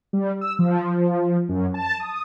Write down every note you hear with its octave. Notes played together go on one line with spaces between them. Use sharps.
G3
E6
F3
F#2
A5
D#6